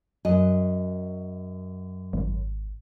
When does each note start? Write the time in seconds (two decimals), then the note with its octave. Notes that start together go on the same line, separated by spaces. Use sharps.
0.25 F#2 F#4 D#5
2.13 G#1